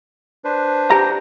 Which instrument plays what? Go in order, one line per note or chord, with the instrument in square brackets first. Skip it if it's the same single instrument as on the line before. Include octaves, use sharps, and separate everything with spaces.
[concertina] D4 B4 C5
[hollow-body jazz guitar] G4 A#5